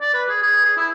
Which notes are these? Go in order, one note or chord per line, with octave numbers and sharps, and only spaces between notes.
D5
B4
G#4
G#4
G#4
E4